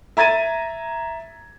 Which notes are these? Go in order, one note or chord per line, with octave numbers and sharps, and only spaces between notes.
E5 A#5 G#6 A6 D#7